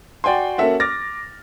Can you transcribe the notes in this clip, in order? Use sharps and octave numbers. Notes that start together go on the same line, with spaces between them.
F#4 D5 G5 G#5 C6
A#3 C#4 F#4 A4 E5 F#5
D6 F6 A6 A#6